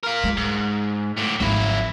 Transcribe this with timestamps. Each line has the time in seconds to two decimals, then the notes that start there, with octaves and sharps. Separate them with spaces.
0.03 F4 A#4
0.24 G#3
0.37 G#2
1.17 A2 D3
1.40 G#1 F3 F#3 E4